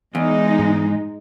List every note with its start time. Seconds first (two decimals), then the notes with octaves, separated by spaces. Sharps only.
0.15 E2 G#3 D#4
0.59 G#2